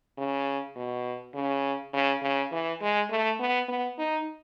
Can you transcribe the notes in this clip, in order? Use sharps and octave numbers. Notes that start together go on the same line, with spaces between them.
C#3
B2
C#3
C#3
C#3
E3
G#3
A3
B3
B3
D#4